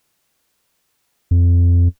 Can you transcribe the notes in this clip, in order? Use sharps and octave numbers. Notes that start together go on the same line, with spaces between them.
F2